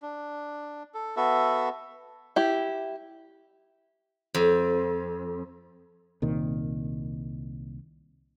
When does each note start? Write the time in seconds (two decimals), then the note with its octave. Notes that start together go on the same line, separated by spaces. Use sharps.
0.02 D4
0.94 A4
1.17 B3 F#4 A4 E5
2.36 E4 G4
4.34 F2
6.22 C2 A#2 D#3